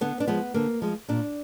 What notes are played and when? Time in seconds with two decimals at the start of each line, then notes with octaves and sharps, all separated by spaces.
0.01 D3 B3
0.20 D4
0.28 F3 G#3 B3
0.54 D3 A#3
0.82 F3 G#3
1.08 A#2 D4